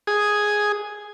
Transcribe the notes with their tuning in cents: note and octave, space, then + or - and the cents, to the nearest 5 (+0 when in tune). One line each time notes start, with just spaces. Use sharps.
G#4 +0 D#6 +0